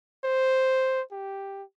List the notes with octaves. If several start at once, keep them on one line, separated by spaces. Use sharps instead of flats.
C5
G4